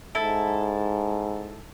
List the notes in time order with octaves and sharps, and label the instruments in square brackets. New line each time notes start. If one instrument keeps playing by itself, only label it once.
[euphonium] G#2 [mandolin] E4 A4